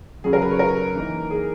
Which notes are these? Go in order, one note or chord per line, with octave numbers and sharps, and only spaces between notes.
C#3 F#3 C#4 G#4
A#4
B4
C#5
A#4
E3 A#3 D#4
G#4